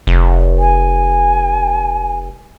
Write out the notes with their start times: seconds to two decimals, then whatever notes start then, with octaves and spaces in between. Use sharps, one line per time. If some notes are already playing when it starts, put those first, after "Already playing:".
0.07 F1
0.59 G#5